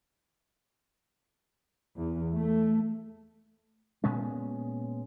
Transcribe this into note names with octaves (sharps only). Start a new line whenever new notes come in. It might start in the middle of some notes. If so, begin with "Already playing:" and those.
E2
A3
A#2 G#3 B3 C#4